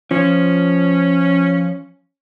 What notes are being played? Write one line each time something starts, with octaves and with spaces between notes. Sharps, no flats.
F3 C#4